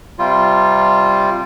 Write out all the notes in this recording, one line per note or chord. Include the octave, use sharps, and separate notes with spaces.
C3 G3 F4